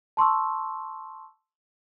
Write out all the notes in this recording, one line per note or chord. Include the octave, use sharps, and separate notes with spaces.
A5 C6 C#6 E6